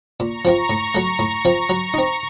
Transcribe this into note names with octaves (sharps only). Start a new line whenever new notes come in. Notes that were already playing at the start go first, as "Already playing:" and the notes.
A#2 A#5 C#6
F3 C4 F4
A2
F#3 A3
A2
F3 C4
F#3
C4 D#4